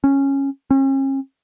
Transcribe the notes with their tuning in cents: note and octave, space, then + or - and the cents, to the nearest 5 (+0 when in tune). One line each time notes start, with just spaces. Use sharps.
C#4 -10
C#4 -40